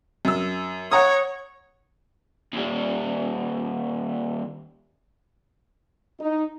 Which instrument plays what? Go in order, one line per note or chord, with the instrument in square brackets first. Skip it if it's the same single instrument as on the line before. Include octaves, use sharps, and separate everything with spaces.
[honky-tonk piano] F#2 E6
[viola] C#5 [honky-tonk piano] F#5 A#5 D#6
[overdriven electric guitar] D#2 G3
[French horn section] D#4